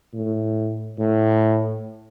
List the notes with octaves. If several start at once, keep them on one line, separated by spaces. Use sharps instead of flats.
A2
A2